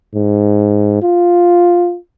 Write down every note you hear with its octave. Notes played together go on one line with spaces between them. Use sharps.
G#2
F4